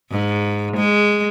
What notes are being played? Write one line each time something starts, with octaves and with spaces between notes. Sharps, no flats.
G#2
G#3